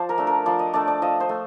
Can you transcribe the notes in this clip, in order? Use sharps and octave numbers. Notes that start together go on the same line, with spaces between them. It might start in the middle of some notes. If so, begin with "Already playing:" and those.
Already playing: F3 C5 D5
A#4
A3 D4
A#4
F3 D5
D#5
A3 D4 D5
D5
F3 D#5
C5
A3